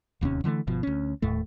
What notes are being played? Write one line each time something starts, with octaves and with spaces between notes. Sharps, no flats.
D1 D#2 C3 C#4
D3 E3 G3 A3
G1 B2 F3
D2 C#4
D#1 D#2 A2 A3